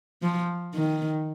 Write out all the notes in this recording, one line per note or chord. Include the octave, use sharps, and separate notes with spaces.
F3
D#3